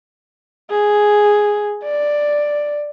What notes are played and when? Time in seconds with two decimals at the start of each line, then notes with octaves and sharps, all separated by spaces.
0.70 G#4
1.84 D5